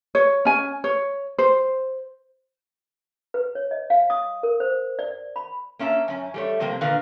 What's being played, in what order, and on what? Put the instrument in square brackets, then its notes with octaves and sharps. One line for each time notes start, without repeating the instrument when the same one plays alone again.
[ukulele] C#5
C#4 G#5
C#5
C5
[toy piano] B4
C#5
D#5
F5
D#6
A#4
C5
D5
B5
[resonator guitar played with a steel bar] A#3 C#4 E5 A5
F#2 C#4
G3 A3 C#5
C3 F3 G3 A#3 C4
A#2 D3 D#3 A#4 B4 F5